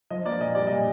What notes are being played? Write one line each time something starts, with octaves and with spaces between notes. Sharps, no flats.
F3 D#5
A#3 D5
A#2 D#5
G3 D5
A#2 D#5